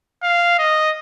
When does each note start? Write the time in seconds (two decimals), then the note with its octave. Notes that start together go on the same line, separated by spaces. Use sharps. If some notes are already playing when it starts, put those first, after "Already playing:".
0.23 F5
0.58 D#5